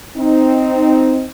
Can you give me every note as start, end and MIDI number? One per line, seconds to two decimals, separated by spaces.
0.17 1.25 60
0.17 1.25 63